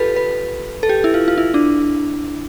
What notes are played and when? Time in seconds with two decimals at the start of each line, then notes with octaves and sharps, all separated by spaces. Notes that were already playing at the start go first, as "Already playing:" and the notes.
Already playing: F4 G4 A4 B4
0.16 B4
0.83 A4
0.89 G4
1.04 E4
1.14 F4
1.28 F4
1.38 E4
1.54 D4